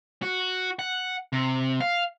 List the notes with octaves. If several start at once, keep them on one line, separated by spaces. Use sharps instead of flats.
F#4
F#5
C3
F5